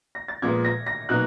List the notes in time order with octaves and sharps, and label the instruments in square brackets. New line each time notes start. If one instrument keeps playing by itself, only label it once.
[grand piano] A#6
A6
[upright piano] A#2 F3 G#3 B3 [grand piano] G#6
[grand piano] A#6
A#6
[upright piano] B2 F#3 A#3 D#4 [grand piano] F#6